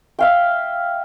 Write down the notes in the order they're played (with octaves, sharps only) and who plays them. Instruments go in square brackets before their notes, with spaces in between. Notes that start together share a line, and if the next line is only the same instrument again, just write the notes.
[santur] E5 F5 G5